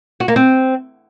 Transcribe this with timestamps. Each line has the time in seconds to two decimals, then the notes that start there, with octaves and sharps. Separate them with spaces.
0.20 F#4
0.28 A#3
0.36 C4